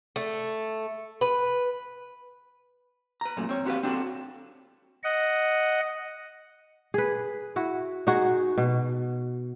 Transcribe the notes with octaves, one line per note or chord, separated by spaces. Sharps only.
A3
B4
B4 A#5
F#2 A#2 A3
C4 C#5
C4 F#4 G4 A#4 B4 F5
C4 D4 F#4 A4
D#5 F#5
G#4 B4
E4 F#4
D#4 F#4 G#4
B2